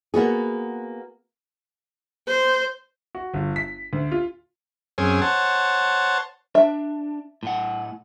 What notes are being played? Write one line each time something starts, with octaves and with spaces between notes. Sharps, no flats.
A#3 B3 F#4 G#4
C5
F#4
G1
B6
D2
F4
F#2 C4 C#4 G#4
C5 C#5 F#5 A5
D4 E5
A2 F#5